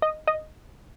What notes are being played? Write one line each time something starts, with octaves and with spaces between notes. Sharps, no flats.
D#5
D#5